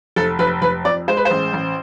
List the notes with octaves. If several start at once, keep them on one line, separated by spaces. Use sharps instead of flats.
F1 A4
F1 B4
F1 B4
F2 D5
G#3 C5
B4
C5
A1
A1